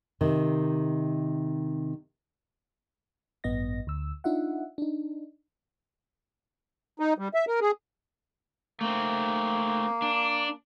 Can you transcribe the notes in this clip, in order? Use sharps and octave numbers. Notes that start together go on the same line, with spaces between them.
C3 D#3
A1 G2 B3 D#5 A#6
D2 E6
D4 D#4 F4 E5 F#5
D4 D#4
D#4
G3
E5
A#4
G#4
A3 A#3 C4
D4